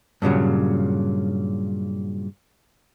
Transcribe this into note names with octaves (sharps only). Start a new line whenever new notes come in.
G2 A#2 C#3 F#3